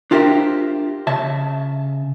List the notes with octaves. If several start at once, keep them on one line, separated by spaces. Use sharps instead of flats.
D4 F4 G4 A#4 C5 E5
C#3 E5 A5